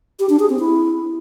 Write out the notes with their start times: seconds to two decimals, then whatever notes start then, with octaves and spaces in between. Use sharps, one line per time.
0.20 G4
0.30 D4
0.40 G#4
0.50 C4
0.60 E4